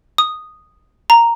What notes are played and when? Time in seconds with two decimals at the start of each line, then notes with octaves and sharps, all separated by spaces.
0.18 D#6
1.10 A#5